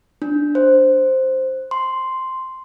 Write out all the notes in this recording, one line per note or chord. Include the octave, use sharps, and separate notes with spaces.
D4
C5
C6